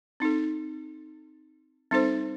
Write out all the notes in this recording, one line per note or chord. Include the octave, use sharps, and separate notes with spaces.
C4 D#4 A4
G3 C4 D#4 A4 C5